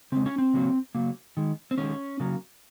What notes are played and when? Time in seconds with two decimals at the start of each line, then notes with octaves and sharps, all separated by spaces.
0.12 C#3 G#3 C4
0.26 C#4
0.38 C4
0.54 C#3 F#3 A#3
0.95 C#3 F#3 A#3
1.37 D#3 G#3
1.71 C4
1.78 D#3 G#3 C#4
2.20 C#3 F#3 A#3